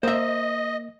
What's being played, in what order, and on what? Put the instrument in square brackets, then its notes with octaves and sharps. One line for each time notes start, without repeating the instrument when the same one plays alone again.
[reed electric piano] A#3 [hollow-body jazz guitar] C5 E5 [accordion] D#5